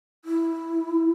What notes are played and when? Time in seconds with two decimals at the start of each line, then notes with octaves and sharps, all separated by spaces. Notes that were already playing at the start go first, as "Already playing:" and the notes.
0.25 E4